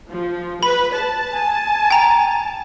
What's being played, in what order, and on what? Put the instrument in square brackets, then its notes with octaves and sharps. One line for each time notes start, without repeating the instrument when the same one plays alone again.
[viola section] F3
[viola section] B4 [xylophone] B5
[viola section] A5
[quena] G#5
[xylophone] G5 A#5